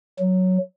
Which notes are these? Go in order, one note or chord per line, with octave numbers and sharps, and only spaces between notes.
F#3